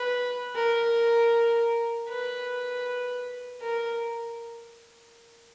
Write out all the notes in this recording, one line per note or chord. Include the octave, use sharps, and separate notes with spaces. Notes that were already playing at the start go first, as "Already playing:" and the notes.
Already playing: B4
A#4
B4
A#4